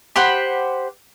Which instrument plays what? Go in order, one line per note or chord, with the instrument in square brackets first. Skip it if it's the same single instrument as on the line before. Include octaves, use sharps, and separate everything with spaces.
[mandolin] G4 C5 F#5 B5